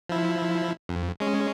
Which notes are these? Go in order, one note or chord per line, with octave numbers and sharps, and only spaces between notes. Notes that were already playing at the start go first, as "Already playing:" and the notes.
F3 E4
F2
G#3 C#4